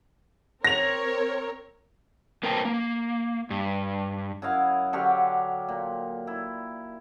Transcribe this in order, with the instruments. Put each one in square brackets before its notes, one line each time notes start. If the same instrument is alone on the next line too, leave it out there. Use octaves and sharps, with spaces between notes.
[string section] C4 A#4 C#5 [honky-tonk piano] A#6 F7
[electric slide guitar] A#3 C4 A#4 B4 G5 A5
A#3
G2
[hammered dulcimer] F#2 E4 D#5 F5
D3 F#3 G4 F5
A#2
E4